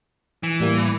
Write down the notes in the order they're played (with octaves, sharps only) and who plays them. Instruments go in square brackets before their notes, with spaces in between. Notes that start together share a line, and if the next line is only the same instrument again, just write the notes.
[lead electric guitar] E3
[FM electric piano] A2 G3 A#3